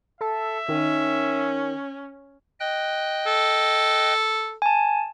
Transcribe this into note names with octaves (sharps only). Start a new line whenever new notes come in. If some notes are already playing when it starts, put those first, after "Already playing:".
A4 E5
D#3 C#4
D#5 G5 F#6
A4
G#5 A5